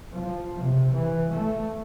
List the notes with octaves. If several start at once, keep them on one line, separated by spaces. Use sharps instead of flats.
F3
C3
E3
A3